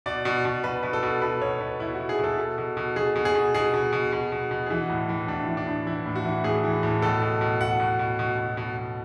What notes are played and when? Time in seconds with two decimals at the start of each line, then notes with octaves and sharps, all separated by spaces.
0.06 B2 D5
0.25 B2
0.45 B2
0.64 B2 B4
0.83 B2 B4
0.93 A4
1.03 B2
1.22 B2 B4
1.41 B2 C#5
1.61 B2 B4
1.80 B2 E4
1.94 B2 F#4
2.09 G#4
2.19 B2
2.24 A4
2.38 B2
2.58 B2
2.77 B2
2.96 B2 G#4
3.16 B2
3.25 G#4
3.35 B2
3.55 B2 G#4
3.74 B2
3.93 B2
4.12 B2
4.32 B2
4.51 B2
4.66 G#4
4.70 E3 F#4
4.90 A2
5.09 E3
5.28 A2 D4
5.48 E3
5.57 D4
5.67 A2
5.86 E3 E4
6.06 A2
6.15 F#4
6.25 E3
6.44 A2 G#4
6.64 E3
6.83 A2
7.02 B2 A4
7.22 B2
7.41 B2
7.60 B2 F#5
7.80 B2
7.99 B2
8.19 B2
8.38 B2
8.57 B2
8.77 B2